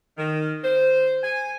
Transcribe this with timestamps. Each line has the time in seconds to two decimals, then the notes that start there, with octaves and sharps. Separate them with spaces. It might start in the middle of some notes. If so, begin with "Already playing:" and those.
0.18 D#3
0.64 C5
1.23 G#5